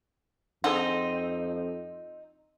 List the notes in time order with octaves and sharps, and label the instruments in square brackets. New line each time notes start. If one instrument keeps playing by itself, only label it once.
[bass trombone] F2 [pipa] C4 [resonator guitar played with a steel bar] D#4 [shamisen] G#4 A4 F#5